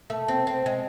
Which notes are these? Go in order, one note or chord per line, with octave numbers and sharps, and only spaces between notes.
A3
C4
C4
G#3